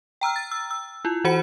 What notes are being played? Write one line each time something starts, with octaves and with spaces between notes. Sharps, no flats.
G5 A#5 E6 F6
A6
E6
E6
E4 F4
E3 F#4 C5 F#5 B5 C#7